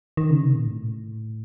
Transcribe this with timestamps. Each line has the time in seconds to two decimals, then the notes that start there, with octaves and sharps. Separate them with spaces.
0.17 D#3
0.30 C#3
0.43 C3
0.55 A#2
0.67 A2